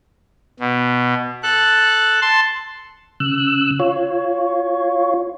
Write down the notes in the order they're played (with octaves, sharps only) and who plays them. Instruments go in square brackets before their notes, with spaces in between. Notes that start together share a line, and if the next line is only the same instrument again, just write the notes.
[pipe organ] B2
A4 F#6
A5 C6
[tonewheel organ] C#3 E6 F#6
F4 C#5